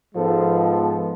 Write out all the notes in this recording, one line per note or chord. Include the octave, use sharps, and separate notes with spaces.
G#2 F3 G#3 B3 A4